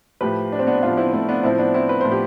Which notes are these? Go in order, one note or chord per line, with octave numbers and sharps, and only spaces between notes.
A2 F3 G4 B4
D4
C4
B3 D4
A2 F3 D4 F4
C4 E4
A3 C4
B3 D4
A2 F3 C4 E4
B3 D4
C4 E4
B4
A2 F3 C5
G4